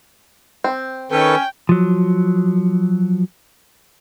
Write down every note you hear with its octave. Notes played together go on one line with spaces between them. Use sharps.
C4
D#3 C#4 A4 B4 G5
F3 F#3